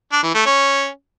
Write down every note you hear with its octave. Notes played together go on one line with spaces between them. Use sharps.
D4
E3
A3
C#4